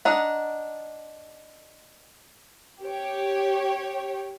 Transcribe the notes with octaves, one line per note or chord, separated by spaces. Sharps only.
D4 D#4 F#5
G4 C#5 G5